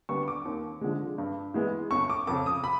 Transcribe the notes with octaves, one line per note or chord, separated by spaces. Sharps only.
D3 G3 B3 C#6
D6
D#2
D3 F3 G#3
G2
E3 G#3 B3
G1 C#6
D6
F2 C#3 D6
D#6
B5